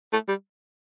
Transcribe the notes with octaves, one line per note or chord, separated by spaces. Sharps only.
A3
G3